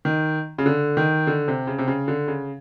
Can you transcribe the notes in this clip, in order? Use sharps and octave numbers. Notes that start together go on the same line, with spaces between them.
D#3
C#3
D3
D#3
D3
C3
C#3
C3
C#3
D3
C#3